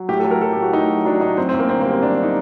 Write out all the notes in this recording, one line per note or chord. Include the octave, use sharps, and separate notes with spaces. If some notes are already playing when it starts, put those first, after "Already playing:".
Already playing: F#3
A2 G4
A4
F#3
A#4
F#3 A4
G4
A2
F#4
A2 D#4
F#3
F#3 D4
A2 D#4
F#2 C4
C4
F#2
A#3
D3 C4
A#3
G3
C4
F#2 D4
D#4